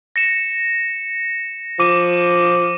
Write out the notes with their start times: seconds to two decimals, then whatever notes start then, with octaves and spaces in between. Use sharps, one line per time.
0.16 A#6 C#7 E7
1.80 F3 D6 D#7